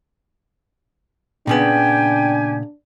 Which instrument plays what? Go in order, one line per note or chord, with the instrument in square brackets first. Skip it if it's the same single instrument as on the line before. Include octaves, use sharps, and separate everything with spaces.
[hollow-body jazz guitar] A#2 C#3 B3 [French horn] D4 [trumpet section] G4 G#5 [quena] G5